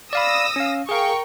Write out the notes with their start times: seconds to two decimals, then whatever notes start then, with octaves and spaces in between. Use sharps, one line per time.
0.13 D5 F5 B5 D#6 E6 A#6
0.56 C#4 F5
0.89 G#4 A#4 F5 G5 C#6